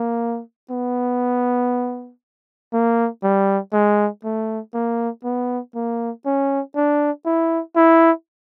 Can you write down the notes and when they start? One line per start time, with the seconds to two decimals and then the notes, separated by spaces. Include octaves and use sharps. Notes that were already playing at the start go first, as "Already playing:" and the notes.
Already playing: A#3
0.71 B3
2.73 A#3
3.23 G3
3.73 G#3
4.24 A3
4.74 A#3
5.24 B3
5.75 A#3
6.26 C#4
6.76 D4
7.26 E4
7.76 E4